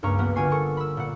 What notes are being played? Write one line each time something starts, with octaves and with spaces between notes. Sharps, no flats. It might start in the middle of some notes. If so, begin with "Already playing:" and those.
C#2 G2 A#3 A#5 C#6
A#3 B3 F#4
G1 A#3 F4 G#5 C#6 C7
A4 A#4 C#6
B5 E6
A#2 F#5